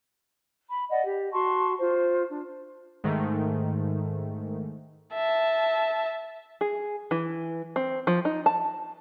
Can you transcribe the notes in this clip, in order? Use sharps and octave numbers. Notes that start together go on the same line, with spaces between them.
B5
D5 D#5 F#5
G4
F#4 A5 C6 C#6
F4 C5
D4
G#2 D#3 A3
E5 A5
G#4
E3
C4
F3
D#4
A5